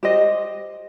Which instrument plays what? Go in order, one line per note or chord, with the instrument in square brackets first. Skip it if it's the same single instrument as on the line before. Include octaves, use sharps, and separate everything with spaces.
[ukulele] G4 C5 D#5